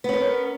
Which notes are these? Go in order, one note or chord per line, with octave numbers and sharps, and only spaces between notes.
B3 C#4 A#4